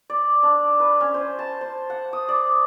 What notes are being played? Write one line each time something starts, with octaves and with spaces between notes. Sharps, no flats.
D5
D4
B4
C#4
C5
A5
C5
F#5
D#6
D5